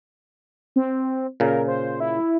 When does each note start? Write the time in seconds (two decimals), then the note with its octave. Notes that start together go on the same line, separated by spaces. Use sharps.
0.76 C4
1.40 A#2 C#3 A#4
1.68 C5
2.00 E4